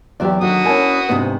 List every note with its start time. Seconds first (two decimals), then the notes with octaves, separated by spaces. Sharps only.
0.20 E2 F#3 G4 D5 E5
0.41 D3 D#3 F#3 F#4 D#6
0.65 C#4 E4 A#4 G#5 A5
1.09 D2 G#2 C3 B3